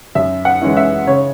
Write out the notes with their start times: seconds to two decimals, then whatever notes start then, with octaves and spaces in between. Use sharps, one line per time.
0.15 F#2 E5
0.45 F#5
0.61 E3 G#3 C#4 E4
0.77 E5
1.07 C#3 C#5